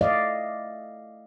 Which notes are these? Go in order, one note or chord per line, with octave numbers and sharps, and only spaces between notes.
A3 D5 D#5 F5